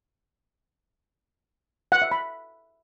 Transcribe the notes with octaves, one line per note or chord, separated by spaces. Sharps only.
F#5
E5
B5